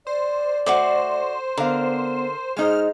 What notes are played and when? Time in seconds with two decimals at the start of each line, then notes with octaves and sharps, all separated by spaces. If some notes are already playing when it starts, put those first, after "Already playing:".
0.07 C5 D5
0.66 A3 F#4 C5 C#6 D6
1.58 D3 B3 A#4 F5
2.57 G#3 D#4 G#4 C5 F6